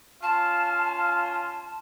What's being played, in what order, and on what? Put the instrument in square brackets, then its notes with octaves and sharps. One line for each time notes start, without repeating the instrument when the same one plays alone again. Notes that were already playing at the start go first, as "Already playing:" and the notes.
[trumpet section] C#4 F4 [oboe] F5 [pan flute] A5